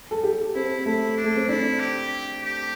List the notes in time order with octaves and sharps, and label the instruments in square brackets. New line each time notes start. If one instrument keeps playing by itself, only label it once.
[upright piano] A4
G4
[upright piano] C4 [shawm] E4
[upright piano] A3 [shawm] E4
[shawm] D4
[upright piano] A3
C4
[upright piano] D4 [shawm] E4
[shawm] G4
G4